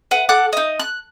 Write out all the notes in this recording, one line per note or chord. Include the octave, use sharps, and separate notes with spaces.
B4 F#5
A4 F#5 D6 F#6
D#4 D#5
F#6